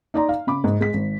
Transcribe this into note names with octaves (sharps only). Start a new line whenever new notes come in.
D#4 D5 A#5 C6
F5
C#3 B5 D6
G#2
G#3 B6
G#1